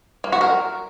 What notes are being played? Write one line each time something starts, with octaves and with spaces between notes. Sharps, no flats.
A#3
F#4
A#4